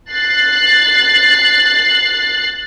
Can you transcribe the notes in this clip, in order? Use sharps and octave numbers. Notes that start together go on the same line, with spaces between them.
F#6 A6 C7